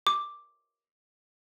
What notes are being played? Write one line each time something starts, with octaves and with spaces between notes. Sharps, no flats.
D6